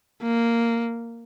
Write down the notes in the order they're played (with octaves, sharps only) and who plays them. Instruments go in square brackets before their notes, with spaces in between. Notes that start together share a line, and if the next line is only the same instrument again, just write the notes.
[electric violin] A#3